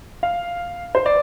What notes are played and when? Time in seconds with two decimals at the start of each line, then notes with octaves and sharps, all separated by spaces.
0.23 F5
0.95 C5
1.06 D5